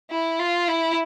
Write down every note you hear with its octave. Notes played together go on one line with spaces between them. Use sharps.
E4
F4
E4